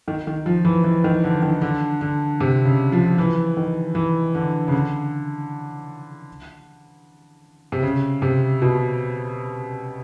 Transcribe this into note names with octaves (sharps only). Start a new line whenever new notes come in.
D#3
D#3
F3
E3
E3
D#3
D3
D#3
D3
D3
C3
C#3
F3
E3
D#3
E3
D3
C#3
D3
C3
C#3
C3
B2